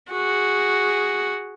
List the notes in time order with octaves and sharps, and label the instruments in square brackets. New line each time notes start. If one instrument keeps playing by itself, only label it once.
[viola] F#4 G#4